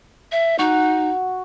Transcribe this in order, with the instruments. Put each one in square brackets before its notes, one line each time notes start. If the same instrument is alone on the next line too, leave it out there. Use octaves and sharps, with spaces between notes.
[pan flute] E5
[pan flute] D#4 [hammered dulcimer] F#4